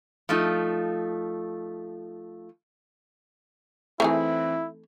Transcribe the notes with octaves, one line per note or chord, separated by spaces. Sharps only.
F3 A3 D#4 F4
E3 A3 C4 D#4 E4 G#4